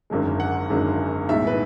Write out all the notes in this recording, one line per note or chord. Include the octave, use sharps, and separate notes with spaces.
G#1 F#2 D3 G#3
F#5
G#1 F#2 D3 G#3
B1 A2 E3 G#3 E5
B4